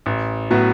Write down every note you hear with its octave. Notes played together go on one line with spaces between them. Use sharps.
A1
A2 F#3 B3